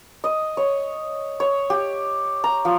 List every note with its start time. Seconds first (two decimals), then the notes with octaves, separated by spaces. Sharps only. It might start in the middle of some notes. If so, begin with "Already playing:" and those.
0.24 D#5
0.57 C#5
1.40 C#5
1.70 G4
2.44 A#5
2.65 F3